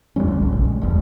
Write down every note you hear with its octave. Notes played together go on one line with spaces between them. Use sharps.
F2 F#3 G3 C#4
D2
G#1 C#2
A#1
G#3
E1 E2 G2